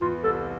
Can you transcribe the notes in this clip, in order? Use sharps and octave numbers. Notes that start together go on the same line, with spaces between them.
E2 E3 F4
C2 C3 A4